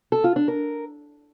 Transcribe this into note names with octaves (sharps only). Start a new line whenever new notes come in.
A4
F4
D4
A#4